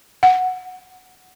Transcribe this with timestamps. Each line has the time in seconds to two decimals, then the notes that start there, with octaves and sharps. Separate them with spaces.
0.23 F#5